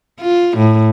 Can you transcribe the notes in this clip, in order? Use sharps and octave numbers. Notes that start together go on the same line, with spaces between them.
F4
A2